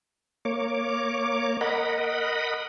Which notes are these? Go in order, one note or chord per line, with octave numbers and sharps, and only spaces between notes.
A#3 C#5 D6
A#4 D#5 F#5 B5